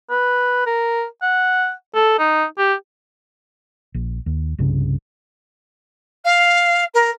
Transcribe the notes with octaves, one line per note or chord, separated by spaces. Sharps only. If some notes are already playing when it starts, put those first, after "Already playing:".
B4
A#4
F#5
A4
D#4
G4
A#1
D#2
C2 G2 C#3
F5
A#4